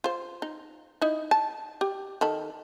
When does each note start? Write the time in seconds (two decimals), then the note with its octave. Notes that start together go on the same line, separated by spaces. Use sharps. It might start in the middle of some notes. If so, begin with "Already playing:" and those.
0.04 F4 C5
0.42 D#4
1.02 D#4 E4
1.31 A5
1.81 G4
2.21 D#3 A4 B5